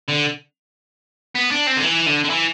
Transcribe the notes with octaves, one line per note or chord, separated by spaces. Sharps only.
D3
B3
D4
C4
D3
E3
D3
D3
E3